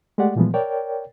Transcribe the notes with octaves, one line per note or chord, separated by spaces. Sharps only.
G#3 A3 G4 D5 F#5
A#2 E3 F3 G3 G#3 B3
A#4 C#5 D5 G5